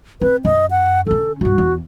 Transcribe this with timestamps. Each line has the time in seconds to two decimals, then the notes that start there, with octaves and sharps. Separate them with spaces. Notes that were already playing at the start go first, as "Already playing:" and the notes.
0.21 C4 B4
0.45 F#2 D#5
0.71 F#5
1.07 D3 C#4 A4
1.41 C#2 G2 F#4
1.58 E2